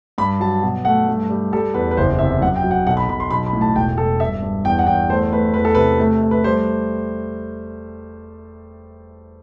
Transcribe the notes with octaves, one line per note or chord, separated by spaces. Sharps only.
G2 B5
F#3 A5
B2
A3 F#5
G2
G3
G3 A4
E2 B4
B4
F#1 C5
C3 E5
F#2 F#5
G5
F#3
F#5
B1 F#5
B5
B1 B5
C6
B1 B5
B5
A2
A5
E1 G5
E1 A4
G2 E5
G2
E2 G5
F#5
E2 G5
A3 C5
A3 B4
E2 B4
A4
C3 B4
A3
A3
B4
G3 C5